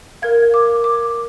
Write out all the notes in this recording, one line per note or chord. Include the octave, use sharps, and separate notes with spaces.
A#4 F5 G#6
D6
D6